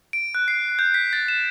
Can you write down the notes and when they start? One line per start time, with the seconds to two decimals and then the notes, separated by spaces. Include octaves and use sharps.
0.13 D7
0.35 F#6
0.48 C7
0.79 G6
0.94 B6
1.13 A6
1.28 E7